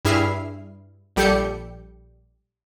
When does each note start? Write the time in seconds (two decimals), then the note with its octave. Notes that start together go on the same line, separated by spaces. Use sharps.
0.05 G2 E4 G#4 F6 C7
1.16 A#1 G3 G4 A4 G6 C#7